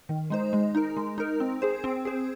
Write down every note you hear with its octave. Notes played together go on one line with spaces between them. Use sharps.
D#3
G#3 D#4 C5
G#3
D#4 A#4
G#3
D#4 A#4
C4
G#4 C5
C4
G#4 C5